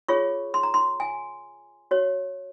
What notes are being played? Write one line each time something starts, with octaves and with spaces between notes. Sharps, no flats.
F4 G#4 C#5 C#6
C6
A#5
C6
G#5
F#4 C#5